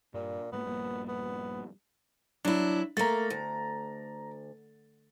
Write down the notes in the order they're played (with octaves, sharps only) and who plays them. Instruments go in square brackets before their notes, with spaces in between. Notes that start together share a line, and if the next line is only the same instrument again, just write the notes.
[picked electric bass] G2 [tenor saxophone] A#2
[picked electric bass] G#2 G3 A#3 [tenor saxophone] B3
[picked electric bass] A#1 G2 A#3
[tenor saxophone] B3
[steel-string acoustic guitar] F#3 E4 [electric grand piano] D4
[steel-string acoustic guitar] A3 A#3 [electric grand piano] A#5 A6
[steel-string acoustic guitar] D2